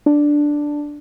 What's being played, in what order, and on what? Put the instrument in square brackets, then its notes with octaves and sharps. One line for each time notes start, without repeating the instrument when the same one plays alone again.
[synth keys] D4